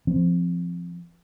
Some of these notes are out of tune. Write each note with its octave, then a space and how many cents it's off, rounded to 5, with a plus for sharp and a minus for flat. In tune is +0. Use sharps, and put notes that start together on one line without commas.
F3 -15 C4 +0